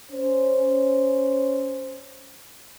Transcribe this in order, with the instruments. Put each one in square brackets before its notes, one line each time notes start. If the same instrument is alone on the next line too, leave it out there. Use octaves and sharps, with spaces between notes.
[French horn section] C#4 C5